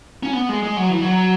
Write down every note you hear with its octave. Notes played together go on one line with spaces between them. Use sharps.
C#4
B3
G#3
G#3
F#3
E3
F#3